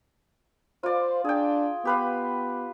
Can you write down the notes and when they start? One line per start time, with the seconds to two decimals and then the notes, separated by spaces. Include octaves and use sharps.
0.83 F4 C5 D5
1.25 D4 G#4 G5
1.85 B3 G4 B4 F5